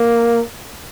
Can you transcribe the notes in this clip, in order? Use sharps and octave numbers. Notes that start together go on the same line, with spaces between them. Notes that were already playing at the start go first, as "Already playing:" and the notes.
Already playing: A#3